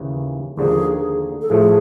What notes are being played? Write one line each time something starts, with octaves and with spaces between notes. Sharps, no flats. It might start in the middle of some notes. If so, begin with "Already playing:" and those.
Already playing: D#2 C#3 E3
D#2 D3 F3 A#3 G#4
A4
A2 F3 A3 G#4